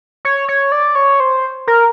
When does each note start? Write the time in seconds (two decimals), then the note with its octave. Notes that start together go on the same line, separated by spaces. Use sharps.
0.25 C#5
0.48 C#5
0.72 D5
0.95 C#5
1.20 C5
1.67 A#4